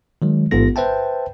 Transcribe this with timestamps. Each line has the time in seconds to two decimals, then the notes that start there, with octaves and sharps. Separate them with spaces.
0.22 D#3 F#3 G#3
0.51 A1 G#2 B3 F4 A4 A#6
0.76 B4 C5 E5 G5 A5